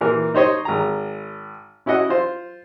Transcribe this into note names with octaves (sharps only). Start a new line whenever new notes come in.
A#2 E3 A#4
D#4 C5 C#5 D#5
G#1 A#5
C#4 E4 F#4 D#5 F#5
F4 C5